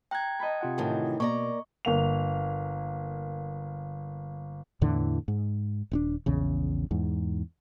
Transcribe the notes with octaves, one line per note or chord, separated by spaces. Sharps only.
G5 A#5 F#6 G#6
D#5 A5 B5
C3 F4 F#5
A2 D#3 E3
B2 A#3 D5 A#5 C#6
G1 A#3 F7
E2 A2 D3 E3
G#2
D#1 C4 D4
A#1 E2 C#3
E2 G#2